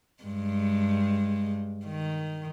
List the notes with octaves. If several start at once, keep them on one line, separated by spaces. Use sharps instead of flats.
G2 G#3
D#3